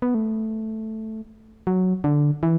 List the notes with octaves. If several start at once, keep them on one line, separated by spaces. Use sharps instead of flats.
B3
A3
F#3
D3
E3